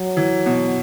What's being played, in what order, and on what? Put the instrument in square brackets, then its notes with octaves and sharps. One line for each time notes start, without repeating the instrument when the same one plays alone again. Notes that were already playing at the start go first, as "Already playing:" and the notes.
Already playing: [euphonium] F#3
[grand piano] E3
B2